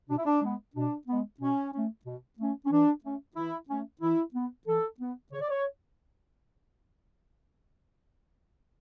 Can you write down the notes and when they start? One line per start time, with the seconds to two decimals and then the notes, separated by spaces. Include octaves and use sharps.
0.09 B2 D4
0.17 E4
0.25 D4
0.42 G#3 B3
0.75 B2 D4
1.08 G#3 B3
1.40 B2 C#4
1.73 A3 C#4
2.06 B2
2.39 A3 C#4
2.66 C#4
2.71 E3 D4
3.04 A3 C#4
3.36 E3 E4
3.69 A3 C#4
4.01 E3 E4
4.35 B3
4.67 E3 A4
5.00 B3
5.32 C#3 C#5
5.41 D5
5.50 C#5